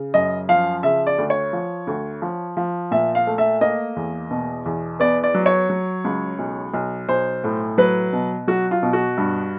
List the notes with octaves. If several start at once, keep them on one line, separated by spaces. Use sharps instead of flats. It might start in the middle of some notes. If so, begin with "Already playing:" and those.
Already playing: C#3
F#2 D#5
F3 F5
C#3 E5
D5
D2
C#5
F3
D2
F3
F3
A#2 E5
F5
A3
E5
A#3 D#5
E2
B2
E2
B3 D5
D5
F#3
C#5
F#3
C#2
B1
B1
B1 C5
A2
F#3 B4
B2
F#3 F#4
F4
B2
F#4
G2